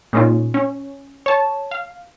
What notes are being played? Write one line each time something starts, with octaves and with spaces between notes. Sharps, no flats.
A#2 G#3 C#4 D#4 F4
C#4
C#5 A5
F5